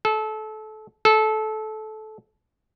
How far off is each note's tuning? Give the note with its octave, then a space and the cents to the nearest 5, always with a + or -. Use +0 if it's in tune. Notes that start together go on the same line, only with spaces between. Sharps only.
A4 -25
A4 -20